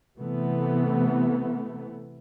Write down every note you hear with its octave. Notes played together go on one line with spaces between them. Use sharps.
C3 E3 A3 B3